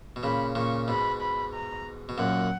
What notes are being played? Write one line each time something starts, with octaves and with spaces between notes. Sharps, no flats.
B2
A#2 C#3 B5
A#2 C#3 C#6
G#2 B2 B5
B5
A#5
B2
F#2 A#2 F#5